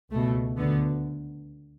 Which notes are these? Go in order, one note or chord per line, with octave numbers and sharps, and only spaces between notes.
C#2 B2 A3
D2 D3 B3